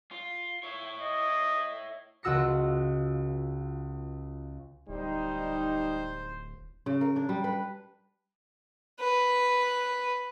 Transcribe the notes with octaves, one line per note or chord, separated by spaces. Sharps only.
F4
E4 C#5
D#5
C#2 F4 F#4 E6 A#6 C#7
D1 G3 D#4 C5
C#3
A#4
D4
G3
B4
B4